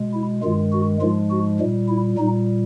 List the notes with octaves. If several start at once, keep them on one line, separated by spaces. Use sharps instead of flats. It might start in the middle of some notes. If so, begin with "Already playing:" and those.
Already playing: B2 G#3
E4
G2 D#3 G#3 F4
F#4
G#2 F3 G#3 F4
F#4
A#2 G3
E4
A#2 G3 D#4